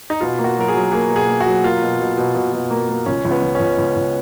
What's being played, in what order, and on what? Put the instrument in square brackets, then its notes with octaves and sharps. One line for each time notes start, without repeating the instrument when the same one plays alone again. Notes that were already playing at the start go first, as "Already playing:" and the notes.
[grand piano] D#4
[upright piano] B2 [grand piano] F4
[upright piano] A#3
[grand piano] F#4
[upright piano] F#3 [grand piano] A#4
[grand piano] G#4
[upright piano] F#3
[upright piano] A#3 [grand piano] G#4
[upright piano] B2
[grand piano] G#4
[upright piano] A#3
[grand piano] F#4
[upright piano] F#3
[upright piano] A#3 [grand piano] F4
[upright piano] B2
B2
B2
B2
B2
A#3
A#3
[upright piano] C#2 [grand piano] C#4
[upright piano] C#2
[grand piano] B3
[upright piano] C#2
[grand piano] C#4
[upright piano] C#2
C#2
C#2